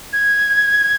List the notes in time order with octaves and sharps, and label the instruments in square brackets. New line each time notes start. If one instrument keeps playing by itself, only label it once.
[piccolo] G#6